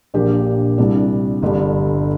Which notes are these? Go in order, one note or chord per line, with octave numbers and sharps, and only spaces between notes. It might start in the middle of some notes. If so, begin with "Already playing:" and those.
A#1 A#2 A#3 D4 G4
C2 C3 G3 D4
G1 G2 D3 G3